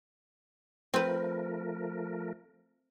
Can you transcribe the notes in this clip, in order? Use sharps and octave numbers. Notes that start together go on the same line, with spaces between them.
F3 A3 C4 A#4 B4